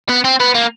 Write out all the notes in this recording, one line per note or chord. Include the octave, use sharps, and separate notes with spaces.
B3
C4
B3
A#3